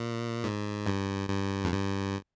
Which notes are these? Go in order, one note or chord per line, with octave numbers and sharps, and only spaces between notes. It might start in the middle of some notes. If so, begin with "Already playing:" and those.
Already playing: A#2
G#2
G2
G2
F2
G2